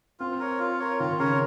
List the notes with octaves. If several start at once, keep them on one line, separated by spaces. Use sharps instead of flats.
C4 F4
A#4 C#5
F4
A#4 C#5
D#3 F4
C#3 A#4 C#5